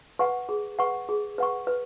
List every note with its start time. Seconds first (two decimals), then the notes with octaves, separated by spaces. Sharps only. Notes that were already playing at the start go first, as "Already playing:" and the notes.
0.19 B4 F#5 C#6
0.49 G#4
0.79 B4 F#5 C#6
1.09 G#4
1.38 B4 F#5 C#6
1.67 B4